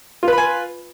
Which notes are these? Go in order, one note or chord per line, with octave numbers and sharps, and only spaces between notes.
F4 B4 G#5 B5